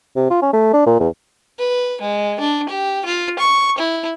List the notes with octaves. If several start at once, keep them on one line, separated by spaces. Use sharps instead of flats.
C3
F4
C#4
A3
D4
A#2
E2
B4
G#3
D4
G4
F4
C#6
E4